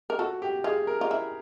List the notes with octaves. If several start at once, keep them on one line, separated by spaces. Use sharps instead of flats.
A#4
F#4 A4
G4
F4 G#4
A#4
F4
E4